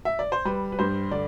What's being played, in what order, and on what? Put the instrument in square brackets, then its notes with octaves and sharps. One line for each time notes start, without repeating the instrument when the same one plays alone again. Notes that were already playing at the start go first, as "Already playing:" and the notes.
[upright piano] E5
D5
C5
G3 B4
B4
G2 C5
D3 D5